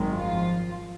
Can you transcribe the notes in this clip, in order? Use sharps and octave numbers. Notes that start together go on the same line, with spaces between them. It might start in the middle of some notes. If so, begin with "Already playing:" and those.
Already playing: G#1 F#2 D#3 G#3
F3 F4